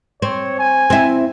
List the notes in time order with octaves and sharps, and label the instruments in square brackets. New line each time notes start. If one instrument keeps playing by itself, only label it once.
[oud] C4 [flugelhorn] C#5
[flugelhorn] G#5
[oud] C4 E4